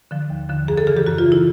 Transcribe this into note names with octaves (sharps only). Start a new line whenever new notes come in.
D3 F3
D#2
D3 F3
F#2 G#4
A4
C#3 E3 G#4
G4
F#2 F#4
F4
C#3 E3
E4